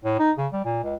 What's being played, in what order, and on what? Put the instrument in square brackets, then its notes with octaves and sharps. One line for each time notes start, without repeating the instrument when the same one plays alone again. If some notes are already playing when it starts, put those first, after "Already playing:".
[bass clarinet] A2
D#4
C#3
G3
A#2
C#2